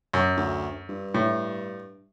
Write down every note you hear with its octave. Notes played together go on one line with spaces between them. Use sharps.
F#2
D2
G2
A2